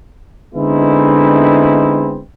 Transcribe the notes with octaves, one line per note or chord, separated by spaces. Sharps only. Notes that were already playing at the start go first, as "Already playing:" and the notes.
D3 G#3 B3 C4 D#4 E4